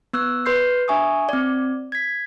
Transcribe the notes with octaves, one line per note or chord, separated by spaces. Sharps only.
B3 E6 F#6
B4 C6 G6 C7
D4 E5 G#5 C#6 D#6
C4 D5
G#6 B6